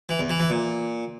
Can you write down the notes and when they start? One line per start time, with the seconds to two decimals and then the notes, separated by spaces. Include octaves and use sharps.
0.09 E3
0.19 E2
0.30 E3
0.40 E3
0.50 A#2